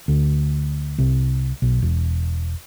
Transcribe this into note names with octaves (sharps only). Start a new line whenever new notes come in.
D2
C2
B1
E1